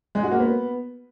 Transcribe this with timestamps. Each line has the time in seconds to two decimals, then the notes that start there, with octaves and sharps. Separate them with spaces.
0.15 G#3
0.23 F#4
0.31 A#3
0.40 B3